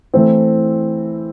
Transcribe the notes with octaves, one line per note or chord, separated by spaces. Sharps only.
E3 A3 C4